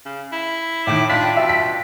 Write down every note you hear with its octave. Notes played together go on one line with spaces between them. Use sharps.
C#3
E4
A2 D#3 D6
D4 F4 G5 B6
B2 E5
B6